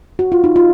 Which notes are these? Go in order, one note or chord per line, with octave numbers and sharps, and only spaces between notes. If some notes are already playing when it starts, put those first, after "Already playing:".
F#4
F4
D#4
F4